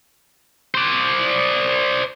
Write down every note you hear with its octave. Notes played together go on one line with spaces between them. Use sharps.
C5 D5